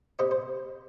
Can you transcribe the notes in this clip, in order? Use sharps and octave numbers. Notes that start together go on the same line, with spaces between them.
C3 C5 D#5
C5